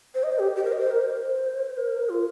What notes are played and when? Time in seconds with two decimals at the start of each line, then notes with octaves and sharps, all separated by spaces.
0.15 C5
0.24 D#5
0.32 C5
0.39 G4
0.56 G4
0.64 A#4
0.72 D#5
0.80 C5
0.91 A#4
1.01 C5
1.77 A#4
2.09 F4